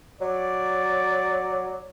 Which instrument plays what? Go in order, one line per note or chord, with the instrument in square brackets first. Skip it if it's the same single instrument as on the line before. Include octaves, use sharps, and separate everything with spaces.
[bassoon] F#3 [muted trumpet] D5